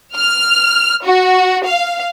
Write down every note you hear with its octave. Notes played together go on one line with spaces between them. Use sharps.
F6
F#4
F5